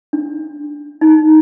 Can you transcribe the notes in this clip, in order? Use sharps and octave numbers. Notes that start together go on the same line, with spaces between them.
D4
D#4